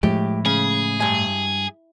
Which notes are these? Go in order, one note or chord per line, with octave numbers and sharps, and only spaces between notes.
A2 F3 G#3 A3 G4
C#3 G#4
G2 G#5